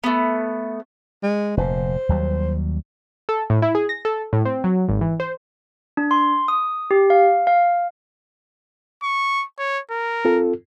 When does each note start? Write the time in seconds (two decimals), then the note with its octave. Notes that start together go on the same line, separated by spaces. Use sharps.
0.04 A3 B3
1.23 G#3
1.57 F1 A#2 C5
2.09 D#2 F#3 G3
3.29 A4
3.50 A2
3.62 E4
3.75 G#4
3.89 A#6
4.05 A4
4.33 A2
4.45 C4
4.64 F#3
4.88 G#1
5.01 E3
5.20 C5
5.97 D4
6.11 C6
6.48 D#6
6.91 G4
7.10 F5
7.47 F5
9.03 C#6
9.58 C#5
9.91 A#4
10.25 C4 F4 A4